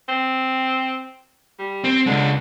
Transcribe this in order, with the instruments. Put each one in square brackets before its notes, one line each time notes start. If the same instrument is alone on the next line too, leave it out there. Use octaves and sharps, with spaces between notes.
[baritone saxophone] C4
G3
[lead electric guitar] C4
[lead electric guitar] C#2 G#3 [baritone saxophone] D3